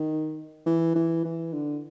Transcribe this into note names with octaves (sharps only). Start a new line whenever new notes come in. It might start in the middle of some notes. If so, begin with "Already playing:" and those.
Already playing: D#3
E3
E3
E3
D3